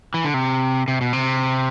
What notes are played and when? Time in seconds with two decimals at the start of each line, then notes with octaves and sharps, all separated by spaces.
0.14 E3
0.24 D3
0.34 C3
0.88 C3
1.01 B2
1.13 C3